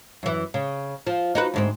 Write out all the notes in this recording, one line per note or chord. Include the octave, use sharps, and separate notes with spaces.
F#2 E3
C#3
F3
D#4 F#4 B4
D2 G#2 C4